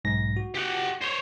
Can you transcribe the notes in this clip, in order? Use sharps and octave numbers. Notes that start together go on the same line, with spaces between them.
B1 G#2 A#6
F#4
G4 F#5
C5 C#5